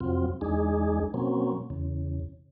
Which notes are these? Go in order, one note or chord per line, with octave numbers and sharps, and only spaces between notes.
F2 C3 F#3 C4 F4
E2 G#3 D4 D#4 G#4
B2 F#3 A#3 C4 C#4
E2 C#3